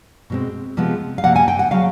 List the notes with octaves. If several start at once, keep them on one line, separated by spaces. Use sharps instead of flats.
B2 G#3 C4
C3 F3 G#3 B3
F5
C3 F3 A#3 F#5
G#5
G5
F#5
C#3 F#3 F5